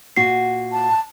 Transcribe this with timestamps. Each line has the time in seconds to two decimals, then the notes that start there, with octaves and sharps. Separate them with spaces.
0.16 A#2 F#4 C7
0.72 A5